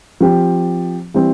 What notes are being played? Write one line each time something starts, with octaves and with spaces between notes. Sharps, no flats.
F3 C4 G4
E3 G3 C4